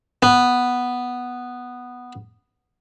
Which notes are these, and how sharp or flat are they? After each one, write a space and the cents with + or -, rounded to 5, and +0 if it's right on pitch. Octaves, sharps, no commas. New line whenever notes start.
B3 +0